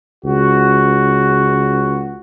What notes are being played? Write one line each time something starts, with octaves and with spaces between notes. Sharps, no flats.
C#2 F#4